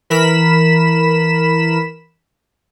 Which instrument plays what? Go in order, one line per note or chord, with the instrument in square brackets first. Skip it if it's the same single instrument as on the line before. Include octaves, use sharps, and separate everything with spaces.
[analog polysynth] E3 A#4 B5 B6 E7